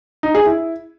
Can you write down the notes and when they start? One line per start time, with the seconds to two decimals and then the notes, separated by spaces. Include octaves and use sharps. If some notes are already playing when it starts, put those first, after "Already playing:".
0.23 D#4
0.35 G#4
0.46 E4